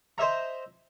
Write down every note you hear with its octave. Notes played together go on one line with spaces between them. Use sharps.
C5 D#5 E5 A#5